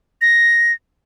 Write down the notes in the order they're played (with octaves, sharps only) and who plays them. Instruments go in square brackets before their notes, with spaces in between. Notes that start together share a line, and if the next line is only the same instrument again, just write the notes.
[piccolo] A#6